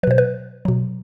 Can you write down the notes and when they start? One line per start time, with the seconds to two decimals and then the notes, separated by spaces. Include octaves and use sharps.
0.03 F#3 B4
0.07 B2 C5
0.18 B4
0.65 B2 F#3